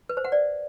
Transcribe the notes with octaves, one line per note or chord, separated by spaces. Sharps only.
B4
C5
F#5
D5